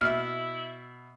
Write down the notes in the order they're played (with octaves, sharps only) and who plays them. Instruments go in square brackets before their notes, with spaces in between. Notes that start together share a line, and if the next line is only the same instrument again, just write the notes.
[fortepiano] B2 E5 [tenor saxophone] E4 [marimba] F6